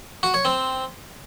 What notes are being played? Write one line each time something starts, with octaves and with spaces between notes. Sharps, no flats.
F#4
C#5
C4